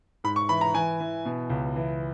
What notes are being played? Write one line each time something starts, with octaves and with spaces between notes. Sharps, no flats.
G#2 B5
C#6
E3 B5
A#5
E3 G#5
E3
B2
C#2
E3